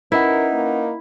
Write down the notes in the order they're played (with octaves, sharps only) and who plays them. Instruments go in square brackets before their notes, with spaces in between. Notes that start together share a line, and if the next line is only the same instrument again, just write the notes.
[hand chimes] C#4 B4 F#5 [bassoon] D#4 [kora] E4 [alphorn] A#4
[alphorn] A#3